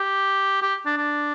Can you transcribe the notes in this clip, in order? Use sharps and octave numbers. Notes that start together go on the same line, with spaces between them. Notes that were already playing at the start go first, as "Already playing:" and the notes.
Already playing: G4
G4
D4
D4